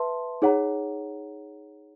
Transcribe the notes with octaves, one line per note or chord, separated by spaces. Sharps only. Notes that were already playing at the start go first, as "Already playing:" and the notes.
Already playing: B4 E5 A5 C6
D#4 G#4 C#5 F#5 A#5